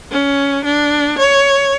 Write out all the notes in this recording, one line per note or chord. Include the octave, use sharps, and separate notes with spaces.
C#4
D4
C#5